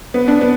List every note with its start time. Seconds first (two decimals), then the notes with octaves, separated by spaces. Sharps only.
0.14 B3
0.28 D4
0.41 B3